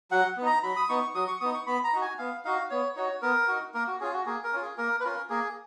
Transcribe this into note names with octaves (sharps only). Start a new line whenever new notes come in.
F#3 F#5
B3
D#4 A#5
F#3 B5
D#6
B3 D#4 C#6
F#3 D#6
C#6
B3 D#4 D#6
C#6
B3 B5
A#5
D#4 F#4
G#5
B3 F5
D#4 F#4 F5
B3 C#5
D#4 F#4 C#5
B3 A#4
D#4 F#4
A#3 A#4
F#4
C#4 F4 G#4
F#4
A#3 G#4
A#4
C#4 F4
G#4
A#3 A#4
B4
C#4 F4 A#4
A#3 G#4